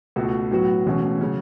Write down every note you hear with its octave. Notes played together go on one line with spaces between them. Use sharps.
C#2 B2 A3 F#4
A2 F#3 B3 F#4
E1 E2 B2 A3 C#4
C#3 F#3 C#4